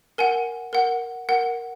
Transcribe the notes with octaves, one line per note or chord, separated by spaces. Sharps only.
A#4 F#5 G#5
A#4 F#5
A#4 F#5